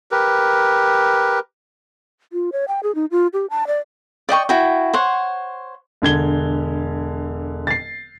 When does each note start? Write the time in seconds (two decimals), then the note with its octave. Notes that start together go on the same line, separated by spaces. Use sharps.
0.11 G4 A#4 B4
2.33 F4
2.52 C#5
2.68 G5
2.83 G#4
2.95 D#4
3.11 F4
3.33 G4
3.50 A5
3.67 D5
4.29 D5 D#5 G5 C#6
4.49 E4 F#4 G5
4.94 C5 C#5 F#5
6.02 E1 D3 G#6 G7
7.67 A6 C7